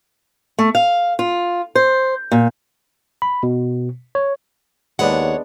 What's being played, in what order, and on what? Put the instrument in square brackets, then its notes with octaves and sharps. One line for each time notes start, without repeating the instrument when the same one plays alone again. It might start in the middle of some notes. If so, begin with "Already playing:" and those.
[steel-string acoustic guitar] A3
F5
F4
C5
A#2
[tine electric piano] B5
B2
C#5
[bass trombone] D#2 [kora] G#3 B3 D4 [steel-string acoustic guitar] C#5 F#5